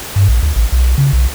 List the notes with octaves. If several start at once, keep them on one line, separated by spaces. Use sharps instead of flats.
G2
A#1
D2
A1
B1
C#3
B1